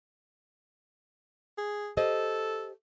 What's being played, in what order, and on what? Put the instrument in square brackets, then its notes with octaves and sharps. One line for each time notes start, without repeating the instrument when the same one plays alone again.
[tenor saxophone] G#4
[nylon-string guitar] G4 C5 D#5 [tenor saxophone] A4